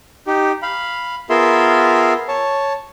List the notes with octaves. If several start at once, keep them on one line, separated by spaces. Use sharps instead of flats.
D#4 G4
F5 B5
B3 F4 G#4 A#4 E5 C6
C#5 A5